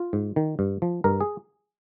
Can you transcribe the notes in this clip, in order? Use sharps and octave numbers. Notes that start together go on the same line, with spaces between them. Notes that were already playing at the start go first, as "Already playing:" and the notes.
Already playing: F4
G#2
D#3
G2
F3
G2 A#4
G#4